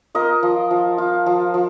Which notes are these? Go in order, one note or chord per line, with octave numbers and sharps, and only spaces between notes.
F4 A#4 D#5
F3
F3
F4
F3
F3